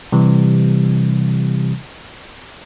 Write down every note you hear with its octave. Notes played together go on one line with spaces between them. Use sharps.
C3 E3 G3